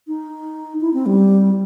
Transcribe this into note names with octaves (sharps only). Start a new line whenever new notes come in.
D#4
E4
C4
G3